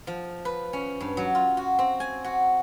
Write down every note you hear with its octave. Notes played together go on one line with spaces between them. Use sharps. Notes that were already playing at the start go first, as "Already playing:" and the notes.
F3
B4
C#4
G2
F#3
F4
F#4
C4
G#5
F#4